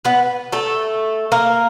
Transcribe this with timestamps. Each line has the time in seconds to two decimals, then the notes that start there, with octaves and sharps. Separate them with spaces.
0.05 B3 B4
0.52 A3 A4
1.32 A#3 A#4